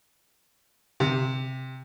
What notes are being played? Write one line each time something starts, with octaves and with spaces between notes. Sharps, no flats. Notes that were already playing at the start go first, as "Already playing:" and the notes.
C3